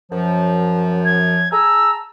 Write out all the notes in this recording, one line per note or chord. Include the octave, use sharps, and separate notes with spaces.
F#2 F3
G#6
G#4 A5 A#5 E6